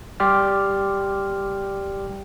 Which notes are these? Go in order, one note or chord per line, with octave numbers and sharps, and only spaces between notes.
G3 G4 D5 G5 C6 F6